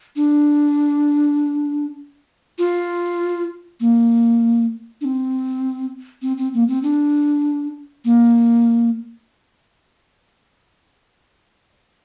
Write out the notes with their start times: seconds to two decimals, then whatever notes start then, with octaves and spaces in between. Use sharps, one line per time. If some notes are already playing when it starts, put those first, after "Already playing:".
0.16 D4
2.59 F4
3.80 A#3
5.01 D4
5.05 C4
6.22 C4
6.38 C4
6.54 A#3
6.68 C4
6.83 D4
8.05 A#3